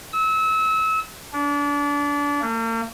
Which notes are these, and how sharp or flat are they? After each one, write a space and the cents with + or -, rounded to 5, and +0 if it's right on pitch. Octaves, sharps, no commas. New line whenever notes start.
E6 -30
D4 -30
A#3 -45